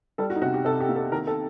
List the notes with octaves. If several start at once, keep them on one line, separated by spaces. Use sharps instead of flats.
G3 A4
F#4
D#4
C3 F#4
G4
C3 A4
G4
A#3
A4
D#3 A#4
A4